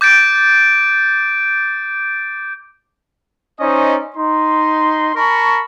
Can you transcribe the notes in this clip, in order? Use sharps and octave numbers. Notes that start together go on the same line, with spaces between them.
D6 G6 A6 D7
C#4 D#4 C5 D5 D#5
D#4 C6
A#4 A5 B5 C#6